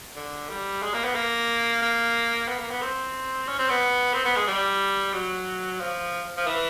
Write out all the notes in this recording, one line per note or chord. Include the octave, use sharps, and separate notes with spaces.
D3
G3
G#3
A#3
B3
A#3
A#3
B3
A#3
B3
C4
C#4
C4
B3
C4
B3
G#3
G3
F#3
F3
F3
E3